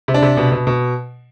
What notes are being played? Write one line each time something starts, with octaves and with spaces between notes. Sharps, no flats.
C3
D4
C3
B2
B2
B2